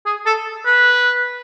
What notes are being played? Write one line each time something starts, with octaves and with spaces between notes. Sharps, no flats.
G#4
A4
B4